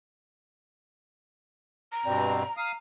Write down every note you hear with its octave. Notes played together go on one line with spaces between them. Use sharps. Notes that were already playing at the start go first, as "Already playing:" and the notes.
A#5
G2 B2 C4 D5
F5 A#5 D#6